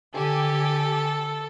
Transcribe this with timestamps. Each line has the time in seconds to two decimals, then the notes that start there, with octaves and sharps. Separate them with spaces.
0.16 D3 G4 A4 G#5